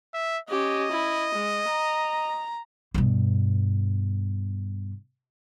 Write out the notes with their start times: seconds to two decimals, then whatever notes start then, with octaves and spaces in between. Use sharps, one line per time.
0.14 E5
0.49 C#4 G4 D#5
0.91 E4
1.34 G#3
1.68 A#5
2.94 G2 B2